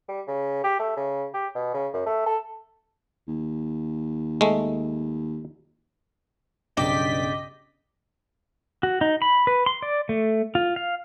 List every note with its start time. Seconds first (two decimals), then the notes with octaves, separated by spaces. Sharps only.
0.08 G3
0.27 C#3
0.64 G4
0.79 A3
0.96 C#3
1.34 G4
1.55 B2
1.74 C#3
1.94 F#2
2.06 A3
2.26 A4
3.28 D#2
4.41 G#3 A3
6.77 B1 G2 C#3 D5 D#5 G5 B6
8.83 F#4
9.01 D#4
9.22 B5
9.47 B4
9.66 C6
9.82 D5
10.09 A3
10.55 F4
10.76 F5